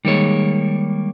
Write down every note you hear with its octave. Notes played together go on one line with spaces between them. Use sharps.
D#3 G3 G#3 A#3 C#5